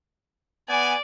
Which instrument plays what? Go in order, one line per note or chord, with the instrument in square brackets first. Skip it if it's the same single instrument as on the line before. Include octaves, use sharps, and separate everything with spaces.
[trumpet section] B3 G#5 [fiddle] D5